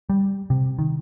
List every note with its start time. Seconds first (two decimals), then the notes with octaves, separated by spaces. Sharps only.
0.09 G3
0.50 C3
0.79 D#3